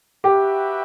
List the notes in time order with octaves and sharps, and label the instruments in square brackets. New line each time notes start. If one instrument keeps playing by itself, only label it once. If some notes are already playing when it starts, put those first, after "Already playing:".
[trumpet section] F#4 B4 E5 G5 [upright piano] G4